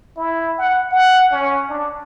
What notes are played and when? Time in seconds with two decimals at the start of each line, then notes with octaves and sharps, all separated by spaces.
0.17 E4
0.58 F#5
0.92 F#5
1.32 C#4
1.69 D4